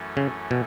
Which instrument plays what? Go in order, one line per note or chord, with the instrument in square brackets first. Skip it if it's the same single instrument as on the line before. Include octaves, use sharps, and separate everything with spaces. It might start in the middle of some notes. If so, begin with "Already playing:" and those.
Already playing: [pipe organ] F#2 E3 A3 C#4
[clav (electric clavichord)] C#3
B2